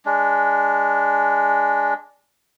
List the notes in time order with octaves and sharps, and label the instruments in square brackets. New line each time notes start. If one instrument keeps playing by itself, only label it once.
[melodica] G#3 D4